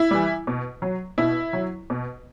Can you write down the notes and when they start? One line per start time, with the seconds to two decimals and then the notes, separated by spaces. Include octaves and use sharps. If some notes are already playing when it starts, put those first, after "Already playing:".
Already playing: E4
0.11 E3 G3
0.47 B2
0.82 F#3
1.18 B2 E4
1.53 F#3
1.90 B2